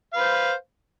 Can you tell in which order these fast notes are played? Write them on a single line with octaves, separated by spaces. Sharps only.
F5 B4 C5